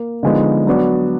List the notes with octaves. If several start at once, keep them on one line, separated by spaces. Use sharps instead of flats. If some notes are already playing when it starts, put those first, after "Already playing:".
Already playing: A#3
D3 F3 G#3 B3 D#4
F#3 B3 D4 F#4